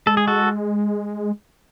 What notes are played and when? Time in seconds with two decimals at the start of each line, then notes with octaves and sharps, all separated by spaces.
0.06 G#3 A4
0.17 G#4
0.27 F#4 A4